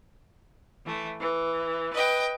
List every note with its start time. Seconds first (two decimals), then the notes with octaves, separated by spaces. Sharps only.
0.85 E3 A3
1.19 E3
1.92 B4 D#5 G5